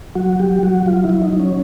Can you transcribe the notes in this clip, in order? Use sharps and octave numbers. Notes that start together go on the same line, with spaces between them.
F#3 F#4
F#3 G4
F#3 F#4
F#3 F4
E4
F#3
D#4
F#3
C#4